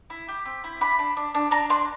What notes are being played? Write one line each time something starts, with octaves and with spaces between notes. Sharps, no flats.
E4
G4
C4
E4
D4 B5
D4
D4
D4
D4 A#5
D4 C6